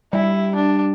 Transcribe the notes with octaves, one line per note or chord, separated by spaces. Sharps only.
G3 E4
D4